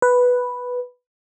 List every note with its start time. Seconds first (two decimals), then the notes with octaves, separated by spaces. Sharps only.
0.02 B4